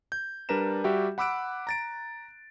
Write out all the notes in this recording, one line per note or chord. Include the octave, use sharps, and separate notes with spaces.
G6
G3 D4 A#4 B4 A#5 E7
G3 F#4 G4 E5 G5
F#5 B5 D6 E6 F#6 D7
A#5 A6 D7